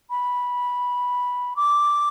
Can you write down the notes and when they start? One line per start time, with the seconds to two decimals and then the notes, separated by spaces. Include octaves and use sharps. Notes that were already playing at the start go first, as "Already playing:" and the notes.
0.10 B5
1.56 D6